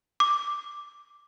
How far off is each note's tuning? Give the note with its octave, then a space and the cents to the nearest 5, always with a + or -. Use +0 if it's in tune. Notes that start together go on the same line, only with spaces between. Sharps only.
D6 +0